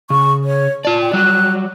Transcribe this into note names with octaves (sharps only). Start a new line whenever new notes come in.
C#3 C#6
C#5
F4 D5 A5
G5
F#3 G3 F#4 F#6